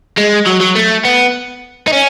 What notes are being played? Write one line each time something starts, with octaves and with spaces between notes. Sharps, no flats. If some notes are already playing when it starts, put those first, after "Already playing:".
G#3
F#3
F#3
A3
B3
D#4
C#4